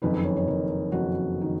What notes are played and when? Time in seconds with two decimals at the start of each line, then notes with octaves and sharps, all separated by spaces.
0.02 F#1 F2 D#3 B4
0.14 B4
0.24 C#5
0.36 C#5
0.47 F#1 F2 D#3 A#4
0.92 F#1 F2 D#3 F#4
1.41 D#3